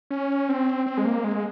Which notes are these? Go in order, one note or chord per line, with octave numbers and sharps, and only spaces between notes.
C#4
C4
C4
G#3
A#3
G#3